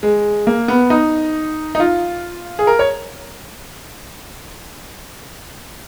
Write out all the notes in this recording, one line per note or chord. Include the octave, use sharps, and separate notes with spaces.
G#3
A#3
B3
D#4
D#4
F4
G#4
A#4
C#5